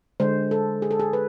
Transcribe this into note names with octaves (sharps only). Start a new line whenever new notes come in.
D3 G#3 C5
A4
G#4
A4
G#4
B4